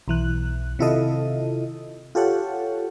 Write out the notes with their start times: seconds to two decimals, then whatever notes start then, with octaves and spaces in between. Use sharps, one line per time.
0.08 B1 E3 F#6
0.79 C3 D#3 E4 F4 A4 D#5
2.15 F4 G4 A4 C#5 F#5